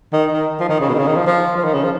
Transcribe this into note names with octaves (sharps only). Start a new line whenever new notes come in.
D#3
D#3
F3
D#3
C#3
B2
D#3
C#3
D#3
F3
F3
F3
D#3
C#3
F3